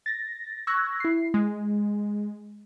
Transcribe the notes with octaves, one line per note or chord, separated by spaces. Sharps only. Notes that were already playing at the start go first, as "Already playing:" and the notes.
A6 A#6
C#6 E6 F#6 G#6 A#6
E4 C7
G#3